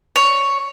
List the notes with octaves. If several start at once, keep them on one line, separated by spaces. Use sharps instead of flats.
C#5